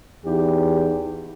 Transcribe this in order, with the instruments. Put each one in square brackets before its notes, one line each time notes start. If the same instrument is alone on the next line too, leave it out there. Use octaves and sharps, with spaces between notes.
[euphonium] E2 [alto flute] D#4 [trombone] G4